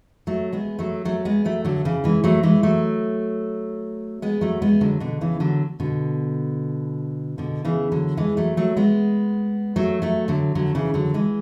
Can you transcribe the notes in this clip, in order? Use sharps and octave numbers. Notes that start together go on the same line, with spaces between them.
F#3 A3
G#3 B3
F#3 A3
F#3 A3
G#3 B3
F#3 A3
D3 F#3
C#3 E3
E3 G#3
F#3 A3
E3 G#3
F#3 A3
G#3 B3
F#3 A3
G#3 B3
D3 F#3
B2 D3
C#3 E3
D3 F#3
B2 D3
B2 D3
C#3 E3
D3 F#3
E3 G#3
F#3 A3
F#3 A3
G#3 B3
F#3 A3
F#3 A3
D3 F#3
D3 F#3
C#3 E3
D3 F#3
E3 G#3